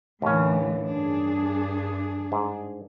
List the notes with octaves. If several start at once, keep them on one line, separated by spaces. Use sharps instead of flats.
D#2 A2 D3 E3 C#4
G2 D4 G#4
G#2